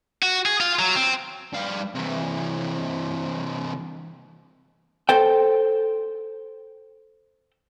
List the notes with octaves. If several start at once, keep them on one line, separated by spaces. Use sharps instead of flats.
F#4
G#4
F4
F#3
C4
G3 F5
C3 E3
A4 C5 G5